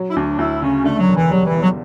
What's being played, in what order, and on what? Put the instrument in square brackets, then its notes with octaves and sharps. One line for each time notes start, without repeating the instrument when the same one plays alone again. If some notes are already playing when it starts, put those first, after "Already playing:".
Already playing: [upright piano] F#3
[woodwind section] E4
[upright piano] D2 [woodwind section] D4
[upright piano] D2 [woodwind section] E4
[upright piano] C#3 [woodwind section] C#4
[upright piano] D3 [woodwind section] A3
[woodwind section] F#3
[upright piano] E1
[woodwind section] E3
[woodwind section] F#3 [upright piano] G3
[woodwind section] E3
[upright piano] E2
[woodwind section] F#3